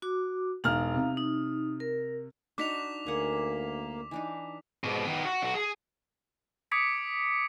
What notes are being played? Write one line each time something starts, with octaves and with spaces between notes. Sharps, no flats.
F#4 D6
E1 D#4 F5 A#5 F6
C3
D#4
A#4
D4 D#4 F#4 D6 B6 F7
D2 A#3 G#4 F#5
E3 D4 D#4
G#2 B2
D#3 B3
F#4
B1 F#4
G#4
D6 D#6 G#6 B6 C#7 D7